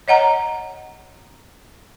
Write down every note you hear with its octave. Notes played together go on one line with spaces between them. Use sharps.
C#5 D#5 F#5 A#5